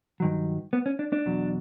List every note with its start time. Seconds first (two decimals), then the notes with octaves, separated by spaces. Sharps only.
0.20 G2 D#3 F#3
0.73 B3
0.86 C#4
0.99 D4
1.13 D4
1.26 E2 B2 F#3